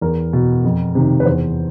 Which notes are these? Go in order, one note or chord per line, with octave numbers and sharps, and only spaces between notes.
E2 A#4
B2
F2
C3 D#3
B4
E2 C5